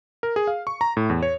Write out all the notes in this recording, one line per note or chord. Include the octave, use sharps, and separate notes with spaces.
A#4
G#4
F5
C#6
A#5
A2
E2
C#5